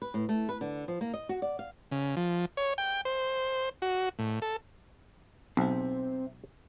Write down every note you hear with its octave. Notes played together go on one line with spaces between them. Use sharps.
B4
A2
A3
B4
D3
F3
A#3
D#5
F#4
D5
F5
C#3
F3
C#5
G5
C5
F#4
A2
A4
B1 C4 C5 E5